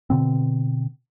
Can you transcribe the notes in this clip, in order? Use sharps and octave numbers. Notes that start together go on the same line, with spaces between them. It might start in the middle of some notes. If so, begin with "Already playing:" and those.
B2 D3 C4